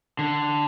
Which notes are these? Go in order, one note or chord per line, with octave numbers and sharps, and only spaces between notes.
D3